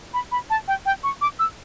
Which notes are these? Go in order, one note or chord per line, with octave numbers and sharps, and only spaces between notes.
B5
B5
A5
G5
G5
C#6
D6
E6